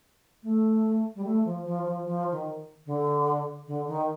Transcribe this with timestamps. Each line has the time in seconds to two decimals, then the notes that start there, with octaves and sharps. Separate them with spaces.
0.43 A3
1.15 G3
1.24 A3
1.44 F3
1.64 F3
1.85 F3
2.04 F3
2.31 D#3
2.86 D3
3.67 D3
3.87 D#3